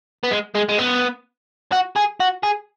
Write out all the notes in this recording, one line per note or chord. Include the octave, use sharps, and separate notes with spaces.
B3
G#3
G#3
G#3
B3
F#4
G#4
F#4
G#4